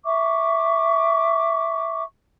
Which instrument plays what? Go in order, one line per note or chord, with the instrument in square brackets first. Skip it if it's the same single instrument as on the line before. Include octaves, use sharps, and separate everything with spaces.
[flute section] E5 C#6 D6